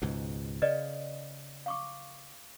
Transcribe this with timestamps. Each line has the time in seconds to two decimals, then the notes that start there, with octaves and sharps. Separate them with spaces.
0.02 C#2 G#2 B2
0.62 C#3 B4 D5 D#5
1.66 F5 C#6 D6